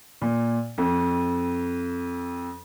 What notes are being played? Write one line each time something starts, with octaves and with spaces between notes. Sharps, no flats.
A#2
F2